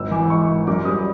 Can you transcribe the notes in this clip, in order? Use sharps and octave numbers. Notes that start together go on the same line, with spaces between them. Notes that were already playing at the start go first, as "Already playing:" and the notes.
Already playing: G#1 E6
E3 D6
G#3 C#6
G#2
F#2 D6
G3 D#6